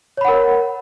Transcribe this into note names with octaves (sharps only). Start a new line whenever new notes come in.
A#4 C#5 F#5 B5